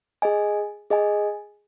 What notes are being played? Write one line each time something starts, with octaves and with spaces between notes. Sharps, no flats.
G#4 D#5 G#5
G#4 D#5 G#5